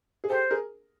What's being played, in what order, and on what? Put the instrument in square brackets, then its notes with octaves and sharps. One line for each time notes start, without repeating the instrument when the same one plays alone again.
[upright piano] G#4
[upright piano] G4 A4 [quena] C5
[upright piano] G#4 A#4